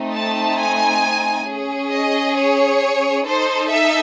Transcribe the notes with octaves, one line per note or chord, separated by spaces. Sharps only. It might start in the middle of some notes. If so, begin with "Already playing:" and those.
Already playing: A3 C4 D#4
A5
G#5
C#4 G#4
D#5
C#5
D#4 A4 C5
E5